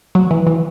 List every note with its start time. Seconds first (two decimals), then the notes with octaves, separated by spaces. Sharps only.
0.15 F#3
0.31 E3
0.47 E3